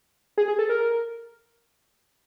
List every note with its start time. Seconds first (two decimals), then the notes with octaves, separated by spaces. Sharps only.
0.38 G#4
0.48 G#4
0.59 A4
0.69 A#4